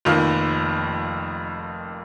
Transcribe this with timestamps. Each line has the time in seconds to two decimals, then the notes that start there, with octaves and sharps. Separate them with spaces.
0.05 F1 F2 D#3 A#3